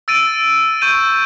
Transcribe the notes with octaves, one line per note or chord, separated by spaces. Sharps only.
E6 A6 D7 D#7
C#6 G6 D#7